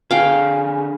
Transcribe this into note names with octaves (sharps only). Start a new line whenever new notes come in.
D3 G#4 F5 G5